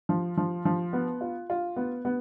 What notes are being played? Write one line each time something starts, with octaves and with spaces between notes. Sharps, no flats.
F3
F3
F3
B3
F4
F4
B3
B3